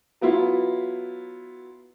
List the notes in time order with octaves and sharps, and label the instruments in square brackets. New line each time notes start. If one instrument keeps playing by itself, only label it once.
[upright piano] F#3 B3 E4 F4